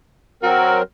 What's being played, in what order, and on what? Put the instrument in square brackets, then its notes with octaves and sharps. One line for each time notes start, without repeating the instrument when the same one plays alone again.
[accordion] F#3 C4 A#4 [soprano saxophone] F#4